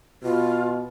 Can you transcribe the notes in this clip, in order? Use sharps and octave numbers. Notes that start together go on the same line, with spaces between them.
B2 F4